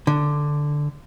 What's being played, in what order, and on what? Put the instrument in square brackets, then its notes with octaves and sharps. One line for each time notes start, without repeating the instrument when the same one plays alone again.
[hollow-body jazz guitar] D3